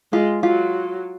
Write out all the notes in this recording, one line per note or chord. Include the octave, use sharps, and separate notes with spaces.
G#3 F4
F#3 F4